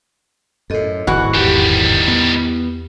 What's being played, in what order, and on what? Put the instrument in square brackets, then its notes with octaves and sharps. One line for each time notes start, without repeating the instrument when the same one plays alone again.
[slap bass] F#2 A2 [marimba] A4 D#5
[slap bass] D1 G#1 G#2 [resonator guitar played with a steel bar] E3 F#4
[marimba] E2 G4 [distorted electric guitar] D#3 G3
[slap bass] B3